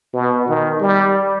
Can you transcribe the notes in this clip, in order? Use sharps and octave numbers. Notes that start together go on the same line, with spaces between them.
B2
D#3
G3